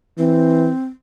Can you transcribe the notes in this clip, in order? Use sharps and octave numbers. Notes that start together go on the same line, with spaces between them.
E3 C4